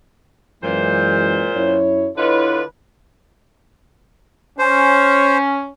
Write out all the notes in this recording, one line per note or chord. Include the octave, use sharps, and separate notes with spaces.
F#2 A#2 E3 G#3 C5
F#2 E4 C#5
D3 E4 F4 B4 C#5 D#5
C#4 C5